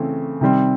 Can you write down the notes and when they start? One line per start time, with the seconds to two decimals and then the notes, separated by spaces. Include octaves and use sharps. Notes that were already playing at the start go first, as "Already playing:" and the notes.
Already playing: C#3 E3 A3 C4
0.41 C3 D#3 G3 C4